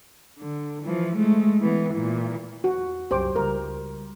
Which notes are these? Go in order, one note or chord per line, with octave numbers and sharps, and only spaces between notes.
D3
E3 F3
G#3 A3
E3 B3
A#2 E3
E2 F#4
C2 F#2 G4 C5 D6
C#2 G3 A#4